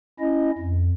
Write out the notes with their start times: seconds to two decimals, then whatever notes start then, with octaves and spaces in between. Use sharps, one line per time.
0.20 C#4 E4 D#5
0.58 F2